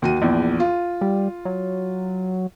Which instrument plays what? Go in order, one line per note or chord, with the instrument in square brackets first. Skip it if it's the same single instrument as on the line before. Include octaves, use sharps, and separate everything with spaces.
[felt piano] D#2 F#4 D#7
A#1 E2
F4
[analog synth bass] G3
F#3